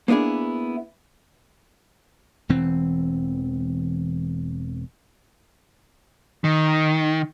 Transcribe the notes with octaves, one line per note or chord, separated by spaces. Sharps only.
A#3 B3 D4 E4 G#4
E1 E3 C4
D#3